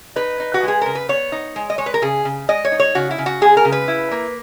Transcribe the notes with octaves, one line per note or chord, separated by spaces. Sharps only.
D#4 B4
D#4
F#4
G#3
G#4
C#3 A#4
B4
B3 C#5
D#4
G#3
D#5
G#3 C#5
B4
A#4
C#3 G#4
C#3
G#3 D#5
C#5
D#4
C#5
C#3 F#4
E4
C#3
F#4
G#3 G#4
A#4
C#3
B4
E4
A#3